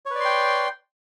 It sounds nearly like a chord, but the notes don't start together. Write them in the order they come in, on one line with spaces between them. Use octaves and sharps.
C#5 B4 D5 C6 G5